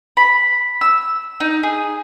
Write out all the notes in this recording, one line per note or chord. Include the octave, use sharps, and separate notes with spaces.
B5
E6
D#4
G#4